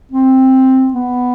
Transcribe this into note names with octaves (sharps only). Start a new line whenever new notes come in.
C4
B3